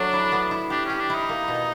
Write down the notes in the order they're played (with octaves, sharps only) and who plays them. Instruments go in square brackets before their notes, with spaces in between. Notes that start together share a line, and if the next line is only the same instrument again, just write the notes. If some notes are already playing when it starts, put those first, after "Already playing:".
Already playing: [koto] F#3 A3 [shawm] D4
[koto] E4
B3
E4
[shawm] D4 [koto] G4
[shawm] C#4 [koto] G4
[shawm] D4
[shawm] D#4 [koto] E4
[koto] A#3
B2